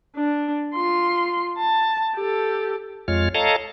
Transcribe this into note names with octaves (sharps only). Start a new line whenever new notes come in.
D4
F4 C6
A5
G4 A4
F2 G#3 F4 C#5 F6
A4 C#5 D#5 F5 A5 A#5